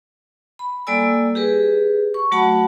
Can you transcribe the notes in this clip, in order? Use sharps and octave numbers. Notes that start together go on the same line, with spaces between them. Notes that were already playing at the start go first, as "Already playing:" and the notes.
B5
G3 A#3 A4 D5 G#5 E6
G4 G#4 B4
C#6
F#3 A3 F#4 F#5 A5 B5